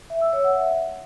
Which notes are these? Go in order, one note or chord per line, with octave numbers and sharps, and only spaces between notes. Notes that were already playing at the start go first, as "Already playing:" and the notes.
E5
E6
C#5
F#5
E5